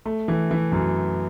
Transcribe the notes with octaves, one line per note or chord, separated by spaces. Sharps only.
A3
E3
E3
F#2